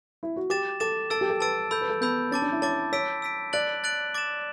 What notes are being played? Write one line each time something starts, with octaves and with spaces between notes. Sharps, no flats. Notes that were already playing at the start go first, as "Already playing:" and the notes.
E4
F#4
G4 D6 A6 E7
A4 D6 A6 E7
A4 A5 E6 A6 D7
G4
A4
B4 A5 E6 A6 D7
A4 B5 E6 G6
B4
A4
B3 B5 E6 G6
C#4 A5 D6 A6
D4
E4
C#5 A5 D6 A6
C#5 E6 B6 D7
E6 B6 D7
D5 F#6 A6 D7 F#7
F#6 A6 D7 F#7
D6 A6 E7